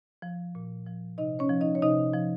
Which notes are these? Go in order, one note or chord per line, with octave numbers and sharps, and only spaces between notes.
F3
A#2
F3
C3 D#4 D#5
C#4 C#5
F3
D#4 D#5
C#5
C3 D#4 D#5
F3